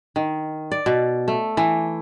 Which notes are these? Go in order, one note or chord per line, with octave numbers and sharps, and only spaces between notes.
D#3
D5
B2
A3
E3